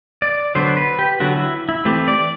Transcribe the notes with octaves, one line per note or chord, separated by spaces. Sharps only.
D5
D3 F#3 B3 C5
B4
G4
D3 F#3 B3 F#4
E4
E4
E3 A3 C4 G4
D5